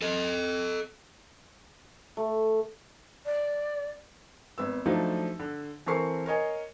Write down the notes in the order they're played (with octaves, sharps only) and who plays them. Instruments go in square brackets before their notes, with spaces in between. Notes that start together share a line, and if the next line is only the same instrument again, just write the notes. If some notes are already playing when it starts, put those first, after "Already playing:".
[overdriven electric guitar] A4 D#5
[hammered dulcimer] A3
[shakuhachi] D5
[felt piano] G#1 B3 E6
F3 F#3 A3 D4 D#4 F4
D3
E3 C4 A4 A#4 C#6 C7
A#4 C#5 D#5 G#5